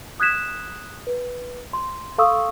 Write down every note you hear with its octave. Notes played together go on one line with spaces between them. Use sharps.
D#6 F#6 G#6 B6 E7
B4
C6
A4 F5 C6 C#6 D#6 E6